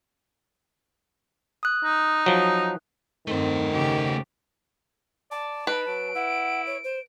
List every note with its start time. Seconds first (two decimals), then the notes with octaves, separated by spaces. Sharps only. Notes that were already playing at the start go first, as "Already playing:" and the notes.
1.63 D#6 F#6
1.83 D#4
2.26 F3 F#3
3.27 G2 D#3 A3 C4 C5
3.73 C#3 G4
5.31 D5 A5
5.67 D#4 B4 D7
5.87 F#3 D7
6.15 E4 F#5
6.66 C#5
6.84 C5